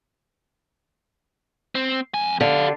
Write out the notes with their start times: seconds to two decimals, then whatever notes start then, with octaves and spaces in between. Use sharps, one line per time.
1.75 C4
2.14 F2 G#5
2.41 D3 G4 F5